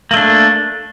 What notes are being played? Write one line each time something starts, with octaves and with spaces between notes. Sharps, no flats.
A3 A#3 D4